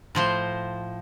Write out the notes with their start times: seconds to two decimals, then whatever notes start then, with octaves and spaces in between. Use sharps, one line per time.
0.15 A2 F3 C5